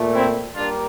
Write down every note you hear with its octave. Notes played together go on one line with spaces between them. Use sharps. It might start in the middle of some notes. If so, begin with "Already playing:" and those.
Already playing: A#2 A3
C4 E4
G3 A#3 D4 F4